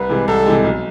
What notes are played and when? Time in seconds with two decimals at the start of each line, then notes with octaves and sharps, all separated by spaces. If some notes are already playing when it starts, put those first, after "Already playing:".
Already playing: C2 B4
0.09 C3 E3 G#3
0.28 C2 A4
0.46 C3 E3 G#3
0.64 B1